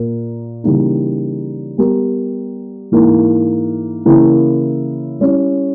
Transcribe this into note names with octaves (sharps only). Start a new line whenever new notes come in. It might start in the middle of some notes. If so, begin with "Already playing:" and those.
Already playing: A#2 A#3 A#4
C#3 E3 G3 A#3 D#4
G3 B3 G4 A#4
G#2 E3 A#3 E4
C#3 E3 A#3 E4 A#4
G3 C#4 E4